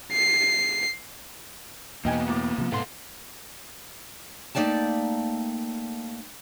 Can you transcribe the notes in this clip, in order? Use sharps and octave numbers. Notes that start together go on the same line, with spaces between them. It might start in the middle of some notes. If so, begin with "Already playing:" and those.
C7
E2 B2 A#3 B3 D#4 G5 G#5
A2 D6
C3 F3
G#2 B2 A4 B4 F5 F#5 C6
A3 A#3 D#4 D5 G5 A5